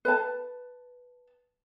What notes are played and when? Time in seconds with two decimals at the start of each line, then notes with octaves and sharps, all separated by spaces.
0.05 B4 A5